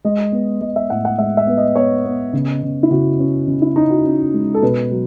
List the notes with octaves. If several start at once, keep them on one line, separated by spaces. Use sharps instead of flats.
G#3 D#5
B3
G#3 D#5
E5
A2 F#5
F#5
G#3 E5
E5
B3
D#5
B3 C#5
B3
C#3
C#3
E4
C#3 F#4
C#4
C#3
E4
C#4 D#4
F#4
C#4
G#3
A4
B2 B4
F#3